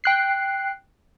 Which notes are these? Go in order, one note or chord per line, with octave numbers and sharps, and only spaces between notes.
G5 F#6 C7